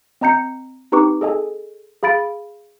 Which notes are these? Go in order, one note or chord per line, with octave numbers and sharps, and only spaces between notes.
C4 D#5 A#5 G6 C#7
C4 D#4 G4 B4 C#6 D6
G#4 A4 D#5 G#5
G#4 F5 B5 A6 D7